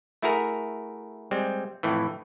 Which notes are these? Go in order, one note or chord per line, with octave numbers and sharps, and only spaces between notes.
A3 E4 F#4 G#4 A#4
G3 G#3 C4
F2 A2 E3